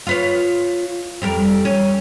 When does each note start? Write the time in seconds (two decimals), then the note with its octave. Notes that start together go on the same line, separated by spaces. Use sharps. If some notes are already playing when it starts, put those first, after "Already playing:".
0.07 F4 B4 C#5
1.22 F2 G3 A#4
1.65 C#4